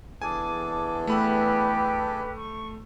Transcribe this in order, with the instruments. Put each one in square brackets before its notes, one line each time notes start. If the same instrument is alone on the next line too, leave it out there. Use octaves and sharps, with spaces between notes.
[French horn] E2 [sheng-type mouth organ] D4 G#4 A4 [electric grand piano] G#5 [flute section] D6
[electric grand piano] A3 B5 E6 [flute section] G4 B4
[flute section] C#6